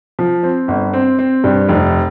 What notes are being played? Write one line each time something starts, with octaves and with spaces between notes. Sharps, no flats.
F3
C4
G1
C4
C4
G2
F1